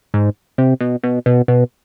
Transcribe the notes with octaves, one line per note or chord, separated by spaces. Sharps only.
G#2
C3
B2
B2
B2
B2